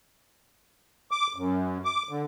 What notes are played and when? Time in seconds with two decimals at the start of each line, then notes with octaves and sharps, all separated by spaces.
1.11 D6
1.36 F#2
1.85 D6
2.09 D3